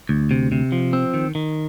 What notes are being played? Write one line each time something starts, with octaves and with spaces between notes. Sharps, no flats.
D2
C3
C3
F3
C4
D#3
D#3